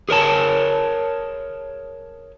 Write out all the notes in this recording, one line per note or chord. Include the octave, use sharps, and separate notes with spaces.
G#4 A#4 C#5 A5